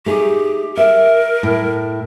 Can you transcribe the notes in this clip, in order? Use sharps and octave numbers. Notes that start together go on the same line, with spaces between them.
A3 D#4 G4 G#4
A#4 E5
A2